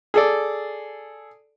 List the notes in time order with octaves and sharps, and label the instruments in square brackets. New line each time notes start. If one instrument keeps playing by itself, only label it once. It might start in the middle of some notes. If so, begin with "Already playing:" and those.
[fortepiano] G#4 A4 D5